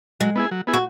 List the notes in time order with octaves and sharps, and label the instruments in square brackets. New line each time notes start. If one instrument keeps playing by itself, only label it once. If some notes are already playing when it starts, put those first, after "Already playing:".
[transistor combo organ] F#3 [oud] G#3
[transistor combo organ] B3 E4 G#4
F#3
B3 E4 G#4
[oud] F#4